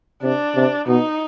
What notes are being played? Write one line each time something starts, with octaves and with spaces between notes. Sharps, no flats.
C3 D4
C3
B2 D#4